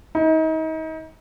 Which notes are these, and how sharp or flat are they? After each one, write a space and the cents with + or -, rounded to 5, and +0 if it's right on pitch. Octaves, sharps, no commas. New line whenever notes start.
D#4 +35